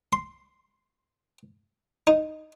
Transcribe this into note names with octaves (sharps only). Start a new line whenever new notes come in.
C6
D#4